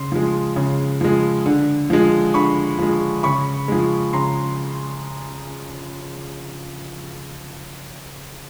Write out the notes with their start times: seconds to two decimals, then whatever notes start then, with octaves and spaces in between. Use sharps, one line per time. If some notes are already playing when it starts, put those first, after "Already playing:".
Already playing: C#3 C6
0.12 F3 G#3
0.56 C#3
1.01 F3 G#3
1.46 D3
1.90 F3 G#3
2.34 D3 B5 C#6
2.78 F3 G#3
3.23 C#3 B5 C#6
3.68 F3 G#3
4.13 C#3 A#5 C6